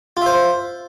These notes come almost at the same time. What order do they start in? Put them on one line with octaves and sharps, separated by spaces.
F4 E5 C5